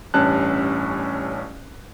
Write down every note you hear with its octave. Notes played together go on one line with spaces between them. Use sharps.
A1 G2 C#4 A5 F#6